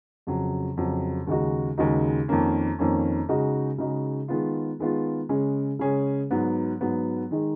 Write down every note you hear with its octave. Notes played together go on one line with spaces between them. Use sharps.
F2 C#3 F#3
F2 C#3 F#3
D#2 C#3 G#3 D#4 F#4
D#2 C#3 G#3 D#4 F#4
F2 D#3 A#3 C#4
F2 D#3 A#3 C#4
C#3 G#3 D#4 F#4
C#3 G#3 D#4 F#4
D#3 G#3 B3 F4
D#3 G#3 B3 F4
C#3 G#3 C#4 G#4
C#3 G#3 C#4 G#4
G#2 F#3 B3
G#2 F#3 B3
D#3 G#3 D#4